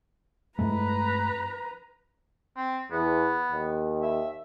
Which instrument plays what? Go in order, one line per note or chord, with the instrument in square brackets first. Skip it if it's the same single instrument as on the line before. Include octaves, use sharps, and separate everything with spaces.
[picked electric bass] G2 G#3 A3 [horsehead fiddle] B4 A#5
[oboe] C4
[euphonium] E2 [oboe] B3
[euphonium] D#2
[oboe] E5